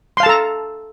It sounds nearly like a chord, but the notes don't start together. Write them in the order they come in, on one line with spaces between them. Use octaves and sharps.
C6 F5 A5 A4 A#5